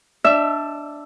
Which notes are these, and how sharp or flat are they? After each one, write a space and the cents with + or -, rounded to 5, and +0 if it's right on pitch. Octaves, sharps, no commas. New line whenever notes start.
D4 +0 E5 +0 E6 +45